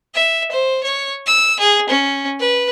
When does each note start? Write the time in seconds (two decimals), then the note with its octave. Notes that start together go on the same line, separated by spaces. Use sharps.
0.15 E5
0.51 C5
0.83 C#5
1.26 E6
1.60 G#4
1.89 C#4
2.39 B4